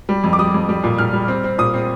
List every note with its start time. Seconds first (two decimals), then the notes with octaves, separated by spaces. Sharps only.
0.09 G3
0.24 F2
0.33 D6
0.39 G3 D#6
0.54 F2
0.69 G3
0.84 A#2
0.99 A#2 F6
1.13 G3
1.28 C4
1.44 C4
1.58 A#2 D#6
1.74 C4